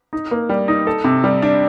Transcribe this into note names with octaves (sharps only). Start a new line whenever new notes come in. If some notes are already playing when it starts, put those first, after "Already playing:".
D#4
A#3
G3
D#4
A4
C3
G3
D4